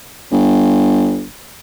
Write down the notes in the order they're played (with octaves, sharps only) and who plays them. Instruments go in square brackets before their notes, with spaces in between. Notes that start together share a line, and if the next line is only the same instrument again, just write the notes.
[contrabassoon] G1